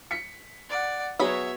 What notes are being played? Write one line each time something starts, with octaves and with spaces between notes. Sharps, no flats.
B6 C#7
D5 F#5
F#3 B3 F#4 G#4 B4 C#5 E5 B5